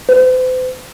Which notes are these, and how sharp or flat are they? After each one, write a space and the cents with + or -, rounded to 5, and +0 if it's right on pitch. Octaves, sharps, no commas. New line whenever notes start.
C5 -45